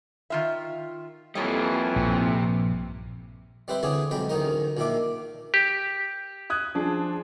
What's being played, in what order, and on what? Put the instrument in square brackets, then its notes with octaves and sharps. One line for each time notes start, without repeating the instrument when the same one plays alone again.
[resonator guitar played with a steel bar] D#3 F4 E5
[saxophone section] F2 E3 [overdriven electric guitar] G3 A#3 [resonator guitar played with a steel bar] A4 C#5 D#5
[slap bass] A#1 G2 [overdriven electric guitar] C3
[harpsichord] G3 C4 B4 C5 E5
D3 E3 C4 G#4 C#5 D5
B1 F2 G#3 G5 B5
A1 D2 D#3 D#4 A#4
A#1 A#2 D#3 D4 E5 D6
[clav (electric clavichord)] G4
[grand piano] D#6 F#6 G#6
F3 D4 G#4